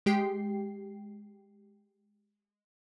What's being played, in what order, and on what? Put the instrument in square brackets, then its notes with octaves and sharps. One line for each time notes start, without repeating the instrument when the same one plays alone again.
[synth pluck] G#3 G4 G5 C7